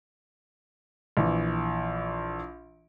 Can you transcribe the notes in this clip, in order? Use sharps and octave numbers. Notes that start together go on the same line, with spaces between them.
A#1 E3